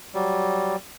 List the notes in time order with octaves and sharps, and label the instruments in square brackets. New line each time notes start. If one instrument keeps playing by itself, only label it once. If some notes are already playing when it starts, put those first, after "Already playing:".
[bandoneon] F#3 G3